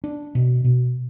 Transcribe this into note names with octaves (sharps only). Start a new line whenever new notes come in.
D4
B2
B2